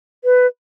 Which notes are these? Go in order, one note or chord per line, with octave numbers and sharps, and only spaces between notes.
B4